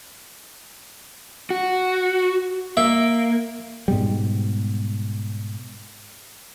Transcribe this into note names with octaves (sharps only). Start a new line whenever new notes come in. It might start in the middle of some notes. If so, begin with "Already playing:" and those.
F#4
A#3 E5
G#2 B2 G3